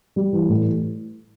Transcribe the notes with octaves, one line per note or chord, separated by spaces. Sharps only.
G3
E3
A2